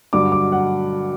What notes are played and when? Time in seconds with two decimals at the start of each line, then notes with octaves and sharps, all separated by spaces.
0.13 G2 D3 F#3 D6
0.32 D6
0.52 F#5